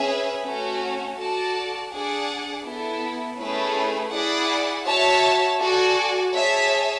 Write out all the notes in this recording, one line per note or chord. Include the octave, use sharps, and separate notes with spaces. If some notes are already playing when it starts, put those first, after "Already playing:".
Already playing: C#4 G#4 B4 E5
A3 C#4 F#4
F#4 A4 D5 A5
D4 G#4 D5 F#5
B3 E4 A4
A3 C#4 E4 G#4 B4
E4 G#4 D5 F#5
F#4 C#5 E5 A5
F#4 A4 D5 G#5
G#4 C#5 E5 A5